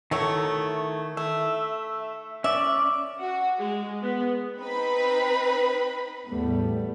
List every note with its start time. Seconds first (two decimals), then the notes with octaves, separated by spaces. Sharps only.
0.11 D#3 F#3 A3 E4 C#5 C#6
1.17 A3 E5
2.44 C#4 D5 E5
3.20 F#4
3.59 G#3
4.01 B3
4.57 C4 D#4 B4 B5
6.28 E2 A2 G3 A3 B3